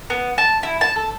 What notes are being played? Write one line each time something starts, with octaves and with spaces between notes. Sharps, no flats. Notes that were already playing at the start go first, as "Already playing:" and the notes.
B3
A5
E4
A5
A4